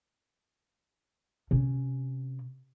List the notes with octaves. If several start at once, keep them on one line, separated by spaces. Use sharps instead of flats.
C3 C#4